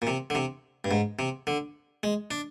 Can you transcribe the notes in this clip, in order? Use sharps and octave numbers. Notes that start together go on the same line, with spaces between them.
A#2
C3
D3
C3
G2
G#2
C3
D3
G#3
D4